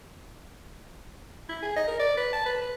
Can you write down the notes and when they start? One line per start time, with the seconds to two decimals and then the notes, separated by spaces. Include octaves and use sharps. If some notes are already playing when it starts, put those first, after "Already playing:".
1.49 E4
1.62 G#4
1.76 D#5
1.88 A#4
1.99 D5
2.17 B4
2.33 A5
2.45 B4
2.61 B4